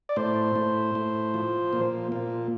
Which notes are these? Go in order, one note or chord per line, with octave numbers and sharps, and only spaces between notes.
D5
A2 C5
A2
A2
F3
A#2
A#2